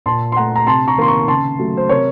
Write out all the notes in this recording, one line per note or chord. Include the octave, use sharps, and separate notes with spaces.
A#2 A5 C6
C6
A3 F#5 A#5
A#5
C3 A5 C6
A#5 C#6
D#3 A#3 C6
A#5 C#6
C#3 A5 C6
F#3 A3
C5
C3 A#4 C#5